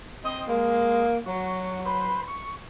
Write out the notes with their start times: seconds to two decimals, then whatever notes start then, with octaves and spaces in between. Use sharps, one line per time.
0.25 C4 D#5
0.48 G#3 A#3
1.26 F#3 F#4
1.85 B4 C5
2.27 C#6